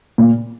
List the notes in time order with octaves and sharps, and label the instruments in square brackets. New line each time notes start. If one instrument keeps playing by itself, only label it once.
[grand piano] A#2